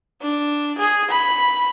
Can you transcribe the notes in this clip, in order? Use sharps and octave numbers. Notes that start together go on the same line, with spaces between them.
D4
G#4
B5